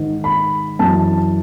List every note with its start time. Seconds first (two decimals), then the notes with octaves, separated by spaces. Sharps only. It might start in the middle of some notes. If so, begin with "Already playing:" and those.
Already playing: G#2 D#3
0.24 B5
0.79 F#2 E3 A5